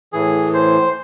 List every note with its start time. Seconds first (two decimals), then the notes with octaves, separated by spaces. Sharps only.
0.13 A2 E3 G#4
0.54 C5